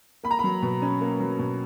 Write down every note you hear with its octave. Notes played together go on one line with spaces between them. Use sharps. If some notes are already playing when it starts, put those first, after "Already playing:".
A#3 B5
A#5
F#3 B5
B2
C#4
A#3
F#3
B2